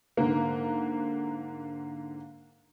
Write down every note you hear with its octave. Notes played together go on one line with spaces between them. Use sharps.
G#2 D3 A#3